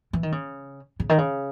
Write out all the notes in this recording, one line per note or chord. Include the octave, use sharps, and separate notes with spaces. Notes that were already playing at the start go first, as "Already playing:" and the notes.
E3
D#3
C#3
C#3
D#3
C#3